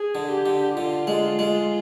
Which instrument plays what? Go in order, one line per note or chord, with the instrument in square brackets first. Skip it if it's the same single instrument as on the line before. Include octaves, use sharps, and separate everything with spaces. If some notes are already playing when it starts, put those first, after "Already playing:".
Already playing: [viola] G#4
[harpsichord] D3
[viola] G4
[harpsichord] D3
[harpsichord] D3 [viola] F4
[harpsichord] G#3
G#3